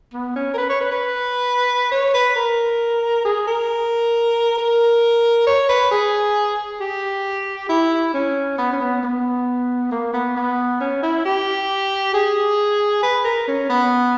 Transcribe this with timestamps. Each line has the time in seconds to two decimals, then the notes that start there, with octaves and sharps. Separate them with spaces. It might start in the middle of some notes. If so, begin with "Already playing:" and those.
0.13 B3
0.36 C#4
0.54 A#4
0.58 B4
0.69 C#5
0.81 B4
0.91 B4
1.91 C#5
2.14 B4
2.36 A#4
3.25 G#4
3.47 A#4
4.58 A#4
5.47 C#5
5.69 B4
5.91 G#4
6.80 G4
7.69 E4
8.14 C#4
8.58 B3
8.73 C#4
8.80 B3
9.03 B3
9.91 A#3
10.13 B3
10.36 B3
10.80 C#4
11.02 E4
11.25 G4
12.14 G#4
13.03 B4
13.25 A#4
13.48 C#4
13.69 B3